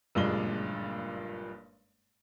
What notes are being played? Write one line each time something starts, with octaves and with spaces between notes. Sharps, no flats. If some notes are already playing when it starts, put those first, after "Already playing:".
F#1 G2 A#2 G#3 D4 G7